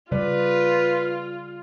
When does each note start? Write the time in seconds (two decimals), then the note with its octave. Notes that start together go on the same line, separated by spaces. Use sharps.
0.12 C#3 G3 F4 B4 D5